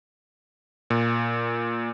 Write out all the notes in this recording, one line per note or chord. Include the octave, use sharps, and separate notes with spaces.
A#2